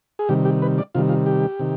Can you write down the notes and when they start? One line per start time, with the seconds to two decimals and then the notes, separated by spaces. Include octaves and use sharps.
0.19 G#4
0.29 C3 D#3 G3 G4
0.45 G4
0.62 B4
0.78 D5
0.95 C3 D#3 G3 F4
1.09 F4
1.26 G4
1.59 C3 D#3